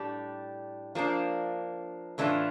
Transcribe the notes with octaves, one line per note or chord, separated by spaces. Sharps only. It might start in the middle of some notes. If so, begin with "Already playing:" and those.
Already playing: A2 G3 D4 G4
F3 A#3 D4
A2 E3 A3 D4 F4